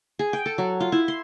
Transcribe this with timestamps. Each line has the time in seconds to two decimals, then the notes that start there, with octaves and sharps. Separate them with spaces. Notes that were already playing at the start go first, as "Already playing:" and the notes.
0.19 G#4
0.33 G5
0.46 A4
0.58 F#3
0.80 F4
0.92 E4
1.08 C6